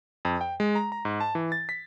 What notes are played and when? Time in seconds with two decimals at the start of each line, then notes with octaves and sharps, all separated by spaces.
0.25 F2
0.41 G5
0.60 G#3
0.75 A#5
0.92 A#5
1.05 G#2
1.20 A5
1.35 E3
1.52 A6
1.69 B6